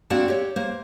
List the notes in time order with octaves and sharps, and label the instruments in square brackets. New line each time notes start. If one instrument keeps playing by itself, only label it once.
[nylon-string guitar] A#3 C4 D4 F#4 D5 A5
G4 C#5
A#3 C5